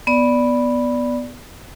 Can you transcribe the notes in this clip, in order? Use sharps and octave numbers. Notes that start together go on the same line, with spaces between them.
B3 D5